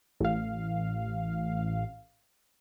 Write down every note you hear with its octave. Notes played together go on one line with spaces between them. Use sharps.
A1 F5